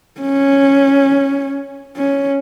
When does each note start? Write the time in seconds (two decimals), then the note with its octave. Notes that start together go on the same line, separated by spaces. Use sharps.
0.20 C#4
1.96 C#4